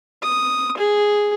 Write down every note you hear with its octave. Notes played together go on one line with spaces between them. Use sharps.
D#6
G#4